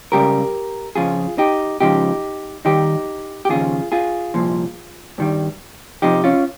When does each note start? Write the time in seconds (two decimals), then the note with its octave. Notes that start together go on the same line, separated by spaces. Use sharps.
0.12 C#2 C#3 G3 G4 A#4
0.96 F2 C#3 F3 F4 G#4
1.38 D#4 G4
1.80 C#2 C#3 F3 D#4 G4
2.65 D#2 D#3 G3 D#4 G4
3.45 G4
3.49 D#2 C#3 F3 F4 G#4
3.92 F4 G#4
4.34 C2 A#2 F3
5.18 G2 D#3 G3
6.02 F2 C3 F3 D#4 G4
6.24 C#4 F4